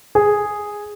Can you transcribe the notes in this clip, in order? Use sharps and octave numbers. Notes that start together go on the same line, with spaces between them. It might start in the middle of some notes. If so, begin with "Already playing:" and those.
G#4